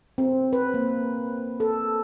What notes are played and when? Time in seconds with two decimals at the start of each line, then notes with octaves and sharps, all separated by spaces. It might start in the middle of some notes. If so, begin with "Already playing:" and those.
0.18 C4
0.53 B4
0.74 A#3
1.60 A4